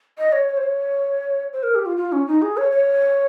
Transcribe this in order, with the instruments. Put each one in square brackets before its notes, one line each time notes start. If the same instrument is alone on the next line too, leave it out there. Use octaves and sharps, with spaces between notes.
[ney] D#5
C#5
C#5
C5
C#5
C5
A#4
G4
F4
F4
C#4
D#4
G#4
C#5
C#5